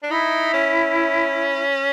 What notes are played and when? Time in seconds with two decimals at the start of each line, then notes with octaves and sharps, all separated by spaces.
0.03 D4
0.10 D#4 E4
0.54 C#4